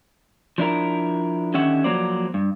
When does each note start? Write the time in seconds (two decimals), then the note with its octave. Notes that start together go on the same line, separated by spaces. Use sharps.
0.58 F3 D4 E4 A#4
1.54 D3 D#3 C#4 G4 E5 F#5
1.84 F3 F#3 A#3 C5 D5
2.34 G2